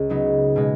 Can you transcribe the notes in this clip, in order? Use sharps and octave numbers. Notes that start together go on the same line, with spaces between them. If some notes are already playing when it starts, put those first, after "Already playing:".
Already playing: C#2
C#3 F#3 B3 D#4
B2 G#3